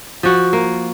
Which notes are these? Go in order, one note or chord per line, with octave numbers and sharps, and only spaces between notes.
F3 F#4
A#3